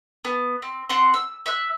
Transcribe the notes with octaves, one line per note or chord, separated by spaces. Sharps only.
B3
C4
C4 F#5 C6
E6
E5 E6 F#6